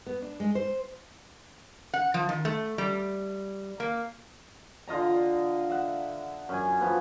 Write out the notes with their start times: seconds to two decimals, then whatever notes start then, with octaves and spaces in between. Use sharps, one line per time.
0.07 B3
0.22 D4
0.40 G#3
0.55 C5
1.94 F#5
2.14 F3
2.29 D#3
2.45 A3
2.78 G3
3.80 A#3
4.88 D3 F4 D#5 A#5
5.70 E5 F#5
6.49 F#2 G#5
6.81 F3 B3